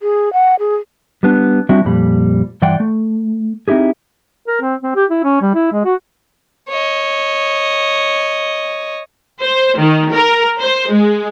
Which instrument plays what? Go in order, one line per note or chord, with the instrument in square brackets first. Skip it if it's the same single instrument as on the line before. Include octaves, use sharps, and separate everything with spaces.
[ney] G#4
F#5
G#4
[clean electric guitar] G3 B3 D4
G3 C4 D4 E4 F#4
F2 A#2 G3 B5
G2 E3 D5 F#5 G5 C6
A3
C4 D#4 E4 G4 G#4
[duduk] A#4
C4
C4
G4
E4
C#4
G3
E4
G#3
F#4
[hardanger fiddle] C#5 D#5
[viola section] C5
D#3
A#4
C5
G#3